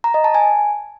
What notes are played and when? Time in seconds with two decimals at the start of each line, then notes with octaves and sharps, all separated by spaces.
0.04 A#5
0.14 D#5
0.24 A5
0.35 G#5